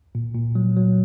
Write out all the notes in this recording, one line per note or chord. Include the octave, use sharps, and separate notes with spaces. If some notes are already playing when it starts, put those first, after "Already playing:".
A#2
A#2
F#3
F#3